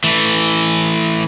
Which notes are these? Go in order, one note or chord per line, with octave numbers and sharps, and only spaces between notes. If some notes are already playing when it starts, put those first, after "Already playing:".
E3 A3